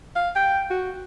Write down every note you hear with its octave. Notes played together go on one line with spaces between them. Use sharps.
F5
G5
F#4